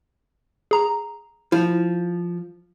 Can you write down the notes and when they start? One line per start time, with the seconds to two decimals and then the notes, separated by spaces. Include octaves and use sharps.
0.71 G#4 A#5
1.52 F3 E4